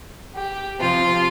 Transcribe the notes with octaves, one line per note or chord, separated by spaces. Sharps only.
G4
C3 F3 F4